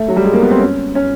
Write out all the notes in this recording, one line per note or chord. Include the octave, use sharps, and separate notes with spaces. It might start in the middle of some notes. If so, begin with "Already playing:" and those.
Already playing: A3
F#3
G3
G#3
A#3
B3
C4
C#4
C#4